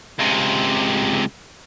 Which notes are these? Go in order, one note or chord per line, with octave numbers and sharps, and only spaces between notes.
C#2 C3